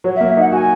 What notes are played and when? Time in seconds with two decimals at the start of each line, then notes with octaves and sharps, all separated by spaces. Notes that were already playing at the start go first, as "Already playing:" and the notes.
0.04 F#3 C#5
0.16 E5
0.21 A#3
0.29 E5
0.37 D#4 F#5
0.52 F#4 G#5